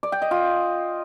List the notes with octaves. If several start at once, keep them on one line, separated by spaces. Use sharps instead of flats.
D5
G5
D#5
F4